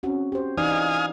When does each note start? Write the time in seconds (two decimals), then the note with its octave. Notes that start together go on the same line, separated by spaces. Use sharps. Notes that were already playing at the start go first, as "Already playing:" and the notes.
0.03 C4 C#4 F#4
0.32 G4 C5
0.57 E3 D#4 D5 F5 G#5 D#6